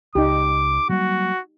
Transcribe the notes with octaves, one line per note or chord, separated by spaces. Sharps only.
C#2 D#4 G4 D6
F#3 G3 A#3 F#4